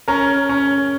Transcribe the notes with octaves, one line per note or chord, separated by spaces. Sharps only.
C#4 A#4
C#4